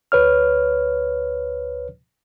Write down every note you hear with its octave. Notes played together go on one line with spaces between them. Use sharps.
D2 B4 C#5 F6